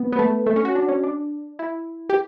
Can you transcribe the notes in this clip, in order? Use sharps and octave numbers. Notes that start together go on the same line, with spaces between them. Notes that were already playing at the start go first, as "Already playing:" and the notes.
Already playing: B3
B3
A3
A3
C#4
F#4
D4
C#4
D4
E4
G4